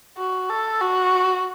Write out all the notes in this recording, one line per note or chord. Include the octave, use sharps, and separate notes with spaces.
F#4
A4
F#4